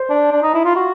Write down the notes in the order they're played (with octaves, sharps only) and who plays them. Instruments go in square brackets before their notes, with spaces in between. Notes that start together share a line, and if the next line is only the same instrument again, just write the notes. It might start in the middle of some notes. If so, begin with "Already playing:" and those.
Already playing: [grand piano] C5
[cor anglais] D4
D4
D#4
E4
F4
F#4